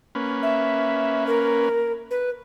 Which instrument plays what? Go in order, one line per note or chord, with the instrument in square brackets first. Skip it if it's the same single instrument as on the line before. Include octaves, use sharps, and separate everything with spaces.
[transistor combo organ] A#3 C#4 B4
[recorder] E5
A#4
B4